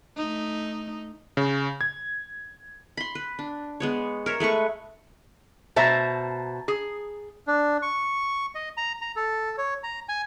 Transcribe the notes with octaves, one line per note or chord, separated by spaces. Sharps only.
A3 D#4
C#3
G#6
B5 C6
B4
D4
G#3 B3 C#5
A#4 C#5 E5
G#3 A3 B4 C#6
B2 C5 E5 A5 A#5
G#4
D4
C#6
D#5
A#5
A#5
A4
C#5
A#5
G#5